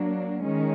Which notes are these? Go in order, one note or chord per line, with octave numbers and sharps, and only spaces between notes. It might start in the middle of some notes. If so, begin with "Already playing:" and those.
Already playing: F#3 A#3 D4
D#3 G#3 C#4